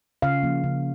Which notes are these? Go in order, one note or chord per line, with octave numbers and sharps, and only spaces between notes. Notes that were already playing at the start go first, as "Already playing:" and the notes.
C#3 F5
F3 A#3
C#3